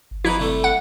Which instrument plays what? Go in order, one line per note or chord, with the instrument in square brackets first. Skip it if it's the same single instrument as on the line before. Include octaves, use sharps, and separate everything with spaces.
[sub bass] G1
[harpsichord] F2 D#4 B4 [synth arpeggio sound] E4
[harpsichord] C3 G3 A3
[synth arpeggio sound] F#5